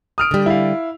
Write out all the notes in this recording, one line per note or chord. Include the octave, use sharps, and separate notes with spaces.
D#6 F6 D7
D3 G3
E4 F5